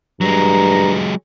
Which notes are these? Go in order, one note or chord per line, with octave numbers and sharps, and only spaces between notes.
G2 F#3 G#3 A#5